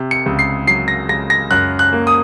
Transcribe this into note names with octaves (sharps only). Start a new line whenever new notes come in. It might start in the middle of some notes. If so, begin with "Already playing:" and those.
Already playing: C3
C#7
C#2
C7
F#3 C7
A#6
C#2 A#6
A#6
F#2 F#6
F#6
A#3
D#6